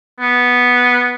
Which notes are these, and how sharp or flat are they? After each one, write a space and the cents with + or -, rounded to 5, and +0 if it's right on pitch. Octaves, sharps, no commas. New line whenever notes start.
B3 -5